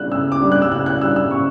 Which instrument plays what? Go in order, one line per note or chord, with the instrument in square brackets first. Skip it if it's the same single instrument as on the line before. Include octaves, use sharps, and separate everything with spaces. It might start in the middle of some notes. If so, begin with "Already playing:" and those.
Already playing: [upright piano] C#3 G3 D4 E6 F#6
C#3 E6
D6
G3 D4
F#6
E6
C#3 F#6
F#6
G3 E6
D4
E6
C#3 C#6